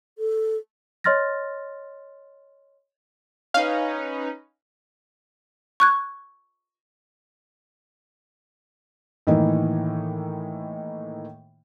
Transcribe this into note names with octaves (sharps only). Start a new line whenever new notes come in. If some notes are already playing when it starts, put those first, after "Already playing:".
A4
C#5 D#5 C6 F6 A6 A#6
C#4 D#4 B4 F5
C#6 F#6 G#6
A2 D#3 E3 A#3 D#4